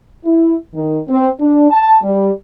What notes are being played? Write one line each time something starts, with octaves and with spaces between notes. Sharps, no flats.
E4
D#3
C4
D4
A5
G3